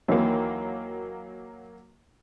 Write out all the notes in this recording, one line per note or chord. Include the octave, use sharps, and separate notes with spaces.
D#2 D#3 E3 F#3 A#3